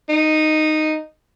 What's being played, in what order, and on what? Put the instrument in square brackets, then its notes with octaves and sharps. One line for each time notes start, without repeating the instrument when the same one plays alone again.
[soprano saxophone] D#4